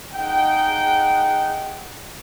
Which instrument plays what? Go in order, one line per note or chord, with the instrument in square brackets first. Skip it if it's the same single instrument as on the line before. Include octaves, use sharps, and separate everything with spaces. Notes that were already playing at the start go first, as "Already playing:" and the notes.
[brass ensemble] D#4 G#4 D#5 F#5 G5